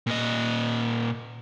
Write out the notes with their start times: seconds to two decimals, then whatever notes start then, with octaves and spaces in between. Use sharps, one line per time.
0.07 A#2 D#5